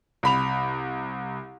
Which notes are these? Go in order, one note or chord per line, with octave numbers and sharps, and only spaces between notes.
C2 B5 F7